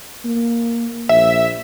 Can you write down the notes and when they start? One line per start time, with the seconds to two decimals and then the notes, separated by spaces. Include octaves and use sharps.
0.25 A#3
1.09 A#1 E5